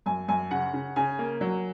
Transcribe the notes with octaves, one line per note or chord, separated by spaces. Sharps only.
F#2 G#5
F#2 G#5
C#3 F#5
C#3
C#3 G#5
A#3
F#3